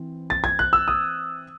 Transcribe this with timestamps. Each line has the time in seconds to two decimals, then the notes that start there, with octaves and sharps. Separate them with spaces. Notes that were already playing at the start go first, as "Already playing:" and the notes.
Already playing: E3 C4
0.30 A6
0.44 G#6
0.59 F#6
0.73 E6
0.88 D#6